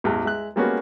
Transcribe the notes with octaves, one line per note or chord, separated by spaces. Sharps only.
A1 E2 G#3
G#3 E5 F#6
G3 G#3 A#3 B3 C#4 F#4